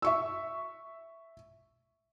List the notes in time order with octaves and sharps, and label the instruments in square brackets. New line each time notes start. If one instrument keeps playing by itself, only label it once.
[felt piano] E5 C#6 E6